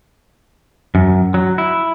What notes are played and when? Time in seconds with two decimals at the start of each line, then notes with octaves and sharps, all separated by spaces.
0.95 F#2
1.34 F#3
1.58 E4